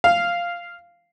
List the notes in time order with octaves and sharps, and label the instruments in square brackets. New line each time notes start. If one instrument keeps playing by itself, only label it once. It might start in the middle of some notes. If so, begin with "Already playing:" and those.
[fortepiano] F5